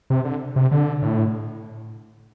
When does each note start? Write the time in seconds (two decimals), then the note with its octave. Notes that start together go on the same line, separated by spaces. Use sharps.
0.10 C3
0.25 D3
0.56 C3
0.71 D3
1.02 A2